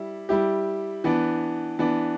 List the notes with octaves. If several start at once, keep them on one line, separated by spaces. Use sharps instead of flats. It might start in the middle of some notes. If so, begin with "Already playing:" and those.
Already playing: G3 E4
G3 E4 G4
E3 B3 D4
E3 B3 D4